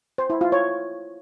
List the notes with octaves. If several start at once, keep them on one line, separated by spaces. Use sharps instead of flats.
C5
E4
F4
C#5